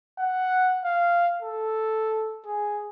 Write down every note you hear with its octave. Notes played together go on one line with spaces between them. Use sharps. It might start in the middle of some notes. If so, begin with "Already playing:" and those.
F#5
F5
A4
G#4